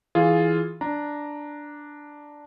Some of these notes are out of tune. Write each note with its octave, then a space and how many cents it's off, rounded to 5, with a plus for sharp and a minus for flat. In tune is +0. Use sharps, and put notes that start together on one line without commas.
E3 +0 F4 +0 G#4 +5
D4 +0 A#5 +0